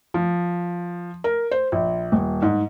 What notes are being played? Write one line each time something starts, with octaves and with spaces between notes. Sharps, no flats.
F3
A#4
C5
A#1
D#1
G#2